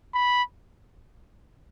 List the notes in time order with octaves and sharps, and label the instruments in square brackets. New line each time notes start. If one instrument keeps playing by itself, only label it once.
[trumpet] B5